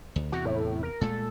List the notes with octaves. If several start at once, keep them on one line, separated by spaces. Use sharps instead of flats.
D2
E2 C3 E3 F#4
A2
A#4
A#2 G#3 A3 A4